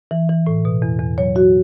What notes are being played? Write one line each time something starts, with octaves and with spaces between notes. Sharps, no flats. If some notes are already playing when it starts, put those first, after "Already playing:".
E3
E3
A2
B2
E2
E2
F#3 C#5
F#3 F#4